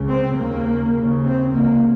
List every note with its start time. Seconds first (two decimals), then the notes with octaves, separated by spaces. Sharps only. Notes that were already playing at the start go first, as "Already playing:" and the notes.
Already playing: C#2 C#3
0.08 C4
0.36 D#2 C#3 A#3
0.94 D#2 C#3
1.24 C4
1.52 C#2 C3 A#3